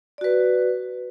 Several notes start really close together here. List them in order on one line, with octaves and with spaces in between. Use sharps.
D5 F#4 B4